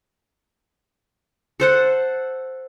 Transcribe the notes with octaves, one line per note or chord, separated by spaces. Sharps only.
A4 C5 F#5